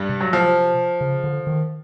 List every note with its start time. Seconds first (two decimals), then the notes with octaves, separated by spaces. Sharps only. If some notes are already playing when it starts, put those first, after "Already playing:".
Already playing: G2 G3
0.09 C3
0.21 F#3
0.33 F3
1.01 C#3
1.24 D3
1.47 D#3